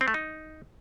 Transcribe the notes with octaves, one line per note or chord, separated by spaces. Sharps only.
C4
A3
D#4